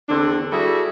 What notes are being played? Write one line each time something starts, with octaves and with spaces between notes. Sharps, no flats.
E2 D3 C4 D4
G3 E4 F#4 G#4 A4